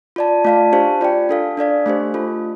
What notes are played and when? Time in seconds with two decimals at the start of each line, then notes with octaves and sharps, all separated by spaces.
0.16 F4 D5 A5
0.44 A3 F4 D5 F5 A5
0.72 D4 G4 C5 F5 A5
1.01 F4 D5 G5
1.29 D4 A4 F5
1.57 D4 A4 D5 F5
1.86 A3 D4 G4 C5
2.14 A3 F4 A4